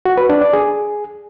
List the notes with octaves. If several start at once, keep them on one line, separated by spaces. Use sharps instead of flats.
F#4
B4
D4
D5
G#4